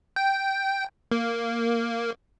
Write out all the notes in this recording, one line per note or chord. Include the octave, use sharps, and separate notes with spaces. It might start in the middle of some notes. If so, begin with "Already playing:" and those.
G5
A#3